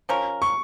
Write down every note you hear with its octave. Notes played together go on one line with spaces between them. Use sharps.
F3 C#4 A#4
C#6